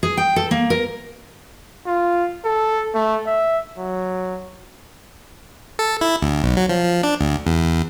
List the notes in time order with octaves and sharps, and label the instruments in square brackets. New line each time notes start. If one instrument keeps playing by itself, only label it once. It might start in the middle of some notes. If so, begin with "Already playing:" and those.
[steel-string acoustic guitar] G#4
G5
A4
A#3
A#4
[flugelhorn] F4
A4
A3
E5
F#3
[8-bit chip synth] A4
E4
D2
B1
F#3
F3
F3
D4
D2
E2